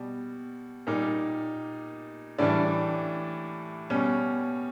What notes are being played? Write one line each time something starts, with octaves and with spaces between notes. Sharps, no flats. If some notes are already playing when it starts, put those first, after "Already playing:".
Already playing: B2 G3
A#2 G3 D#4
A2 E3 G3 D4
B2 G3 C#4